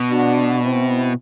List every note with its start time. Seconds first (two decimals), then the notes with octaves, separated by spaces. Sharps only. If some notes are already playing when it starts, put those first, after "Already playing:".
Already playing: B2
0.10 D4 F#4
0.62 C4 E4